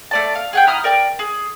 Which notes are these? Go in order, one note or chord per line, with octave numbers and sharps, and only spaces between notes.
A3 D5 A5
F5
G#4 F#5 G5
E4 A#5 D#6 F6
A#4 D5 G5
G#4